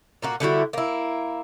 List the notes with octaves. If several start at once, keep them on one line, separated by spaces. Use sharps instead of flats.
A#2 A#3 F#4
D3 G3 E4 F#4
A#3 E4